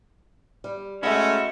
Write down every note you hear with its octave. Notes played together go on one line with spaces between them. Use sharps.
G3
G#3 A3 C#4 E4 F#4 D#5 E5